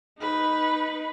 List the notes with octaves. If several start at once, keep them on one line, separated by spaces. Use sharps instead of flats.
D#4 B4